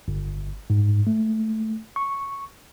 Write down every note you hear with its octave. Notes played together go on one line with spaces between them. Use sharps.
G1
G#2
A3
C#6